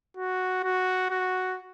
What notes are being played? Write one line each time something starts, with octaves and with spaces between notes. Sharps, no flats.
F#4
F#4
F#4